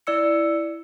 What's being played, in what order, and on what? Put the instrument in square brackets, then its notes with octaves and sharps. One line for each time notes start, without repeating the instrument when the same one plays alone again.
[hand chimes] E4 D5 E6 C#7